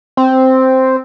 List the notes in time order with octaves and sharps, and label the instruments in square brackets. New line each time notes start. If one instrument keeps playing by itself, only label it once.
[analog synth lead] C4